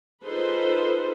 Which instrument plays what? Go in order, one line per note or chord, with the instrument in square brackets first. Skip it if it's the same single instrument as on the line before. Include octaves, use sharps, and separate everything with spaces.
[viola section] D#4 F4 G#4 A4 B4 C5